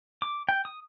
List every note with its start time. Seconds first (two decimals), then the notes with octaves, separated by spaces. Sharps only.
0.22 D6
0.49 G5
0.65 D#6